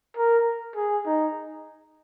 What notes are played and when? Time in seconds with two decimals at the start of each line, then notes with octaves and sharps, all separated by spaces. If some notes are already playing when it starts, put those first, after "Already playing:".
0.17 A#4
0.76 G#4
1.06 D#4